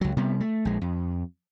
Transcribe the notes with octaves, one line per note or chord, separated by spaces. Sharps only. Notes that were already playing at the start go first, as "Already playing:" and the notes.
C#2 F#3
C3 G3 B3
A3
A#1 G#3
F2